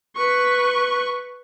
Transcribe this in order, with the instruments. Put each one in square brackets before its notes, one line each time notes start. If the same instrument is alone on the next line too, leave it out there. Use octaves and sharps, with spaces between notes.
[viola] B4 C#6